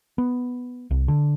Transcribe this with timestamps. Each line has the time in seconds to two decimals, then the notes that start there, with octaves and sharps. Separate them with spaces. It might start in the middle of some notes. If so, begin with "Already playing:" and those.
0.18 B3
0.91 C2
1.08 D3